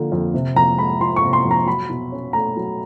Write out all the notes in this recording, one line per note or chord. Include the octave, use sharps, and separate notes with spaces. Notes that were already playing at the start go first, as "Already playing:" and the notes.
Already playing: D3 F3 A#3
F2
C3
F2 A#5
G#3 B5
F3 C6
C#6
C3
C6
F2
A#5
F#3 B5
B2
C#4
A3 A#5
F#3